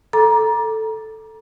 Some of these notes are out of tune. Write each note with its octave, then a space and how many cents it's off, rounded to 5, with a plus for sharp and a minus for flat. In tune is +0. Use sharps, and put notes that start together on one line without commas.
A4 +0 A#5 +25 D6 +5